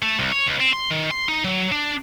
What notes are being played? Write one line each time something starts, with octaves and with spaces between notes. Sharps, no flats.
A3
C2
C#5
C#2
C4
C6
D#3
C6
D#4
F#3
D4